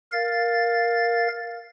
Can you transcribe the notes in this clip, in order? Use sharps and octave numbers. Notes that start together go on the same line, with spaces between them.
A#4 F5 A6